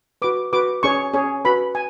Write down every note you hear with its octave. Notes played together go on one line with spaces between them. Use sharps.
F#4 B4 D6
F#4 B4 D6
C#4 G#4 C#5 C#6
C#4 G#4 C#5
F#4 B4 B5
G#5